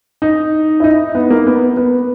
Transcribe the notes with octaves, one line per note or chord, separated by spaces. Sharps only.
D#4
E4
D#4
B3
A#3
B3
B3